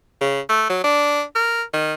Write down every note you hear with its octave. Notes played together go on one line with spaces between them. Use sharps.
C#3
A3
F#3
D4
A#4
D#3